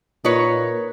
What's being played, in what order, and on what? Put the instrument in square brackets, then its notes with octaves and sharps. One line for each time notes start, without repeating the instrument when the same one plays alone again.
[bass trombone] A#2 [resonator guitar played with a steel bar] D#4 B4 C#5